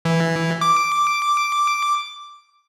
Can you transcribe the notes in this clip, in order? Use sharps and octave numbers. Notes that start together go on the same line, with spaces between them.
E3
D6